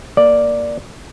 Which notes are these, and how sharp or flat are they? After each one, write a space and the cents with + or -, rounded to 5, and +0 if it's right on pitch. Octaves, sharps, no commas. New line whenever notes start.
A#3 +0 D5 +0